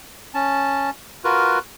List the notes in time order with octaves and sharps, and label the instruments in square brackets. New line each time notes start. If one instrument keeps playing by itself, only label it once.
[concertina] C#4 A5
F4 F#4 A#4 B4